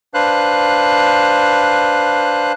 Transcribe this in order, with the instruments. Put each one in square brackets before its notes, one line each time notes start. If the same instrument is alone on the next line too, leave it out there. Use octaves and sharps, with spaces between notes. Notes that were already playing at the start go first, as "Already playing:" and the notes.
[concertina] D4 B4 C5 F5 F#6